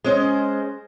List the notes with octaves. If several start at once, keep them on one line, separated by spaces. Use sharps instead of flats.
G#3 C#4 C5 D#5